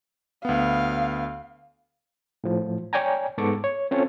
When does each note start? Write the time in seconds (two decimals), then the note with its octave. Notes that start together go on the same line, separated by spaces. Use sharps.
0.45 D2 B3 F5
2.44 A2 F3
2.93 C#5 D5 G5 G#5 A#5
3.38 G#2 B3 A4 C#6 D6
3.64 C#5
3.91 C4 C#4 F4 A4 C5 C#5